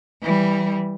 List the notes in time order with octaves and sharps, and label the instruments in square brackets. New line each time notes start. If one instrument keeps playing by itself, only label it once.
[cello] E3 G3